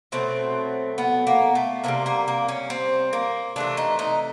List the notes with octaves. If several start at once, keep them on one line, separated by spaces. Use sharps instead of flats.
B2 F#3 A3 C4
B3
A#3
A3
C3 E3 G3 A#3
A#3
A#3
C#4
C4
A#3
C3 E3 A3 D4
D#4
D#4